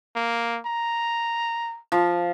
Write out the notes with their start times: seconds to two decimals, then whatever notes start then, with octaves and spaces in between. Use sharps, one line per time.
0.16 A#3
0.66 A#5
1.92 F3